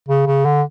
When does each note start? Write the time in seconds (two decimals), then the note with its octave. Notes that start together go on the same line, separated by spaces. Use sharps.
0.08 C#3
0.26 C#3
0.45 D3